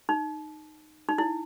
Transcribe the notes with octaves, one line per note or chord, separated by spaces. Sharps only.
D#4
D#4
E4